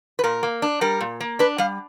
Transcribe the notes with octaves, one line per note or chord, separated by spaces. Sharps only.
B4
A#2 A#4
A#3
D4
G3 A#4
A#2
A#3
D4 B4
G3 F5